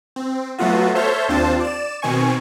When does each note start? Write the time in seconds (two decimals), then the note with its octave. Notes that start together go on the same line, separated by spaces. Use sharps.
0.16 C4
0.58 F#3 A3 B3 F4 F#4
0.95 A4 C5 C#5 E5 F6 G6
1.28 D#2 C4 D4 F4 C5 A5
1.60 D5 E7
2.02 B2 D#3 C4 G#5 C#6